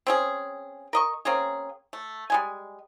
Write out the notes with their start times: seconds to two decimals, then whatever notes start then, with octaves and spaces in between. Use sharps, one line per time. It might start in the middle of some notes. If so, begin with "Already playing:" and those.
0.07 C4 C#4 G#4
0.93 A#4 D#5 C#6
1.25 A#3 C4 C#4 G#4
1.93 A3
2.30 G3 G#3 G#5